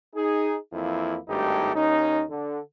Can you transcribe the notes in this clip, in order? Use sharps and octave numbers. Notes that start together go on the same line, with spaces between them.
D#4 G#4
F2 E3 A#3 E4
G#1 G2 A3 D#4 G4
D#2 C#4 D#4
D3